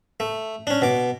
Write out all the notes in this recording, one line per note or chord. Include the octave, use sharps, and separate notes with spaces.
A3
C#4 D4
B2 D6